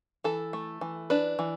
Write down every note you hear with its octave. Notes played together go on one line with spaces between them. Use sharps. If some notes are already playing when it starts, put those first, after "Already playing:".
E3 A4
A3
E3
D4 B4
E3